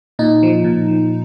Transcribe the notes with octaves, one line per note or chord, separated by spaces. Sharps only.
A#2 D#4
F3
A#2
F3